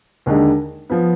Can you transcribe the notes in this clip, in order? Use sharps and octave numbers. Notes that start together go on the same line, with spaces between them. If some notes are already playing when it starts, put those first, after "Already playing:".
D#2 D3 G#3 D#4
F3 B3